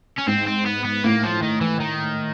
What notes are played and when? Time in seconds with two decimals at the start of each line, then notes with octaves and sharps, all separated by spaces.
0.18 C#4
0.27 G#2 C4
0.47 C4
0.66 B3
0.85 B3
1.04 A2 A#3
1.23 F3
1.42 D#3
1.61 E3
1.80 D#3